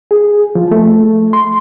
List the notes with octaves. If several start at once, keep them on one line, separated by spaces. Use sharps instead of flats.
G#4
F3
A3
C6